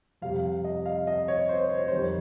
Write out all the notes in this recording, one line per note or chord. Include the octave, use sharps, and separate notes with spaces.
F2 C3 G3 F5
D#5
F5
D#5
C#5
C5
C5
C#5
C5
F2 D#3 G3 C#5